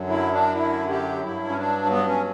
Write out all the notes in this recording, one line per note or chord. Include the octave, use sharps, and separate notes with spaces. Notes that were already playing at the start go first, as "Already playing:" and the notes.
Already playing: F#2 D3 F#3
E4
D4
E4
G4
G2 F#3 E4
C#4
D4
B3
C#4